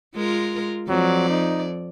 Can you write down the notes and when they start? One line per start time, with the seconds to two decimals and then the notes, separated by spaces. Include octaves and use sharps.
0.15 G#3 F4 A#4
0.88 F2 F#3 D5
1.30 D#4